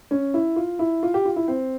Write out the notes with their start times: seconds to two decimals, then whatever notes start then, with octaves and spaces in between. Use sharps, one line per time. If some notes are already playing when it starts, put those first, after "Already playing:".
0.11 C#4
0.34 E4
0.56 F4
0.79 E4
1.03 F4
1.14 G4
1.25 F4
1.36 E4
1.48 C4